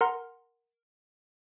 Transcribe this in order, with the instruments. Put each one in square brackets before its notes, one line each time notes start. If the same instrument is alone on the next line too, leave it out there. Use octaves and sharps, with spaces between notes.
[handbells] A#4 F#5 A#5 C6